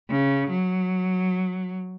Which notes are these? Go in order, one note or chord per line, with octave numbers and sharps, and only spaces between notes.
C#3
F#3